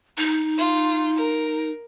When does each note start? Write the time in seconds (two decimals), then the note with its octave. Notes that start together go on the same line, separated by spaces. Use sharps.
0.17 D#4
0.58 F4
1.16 A#4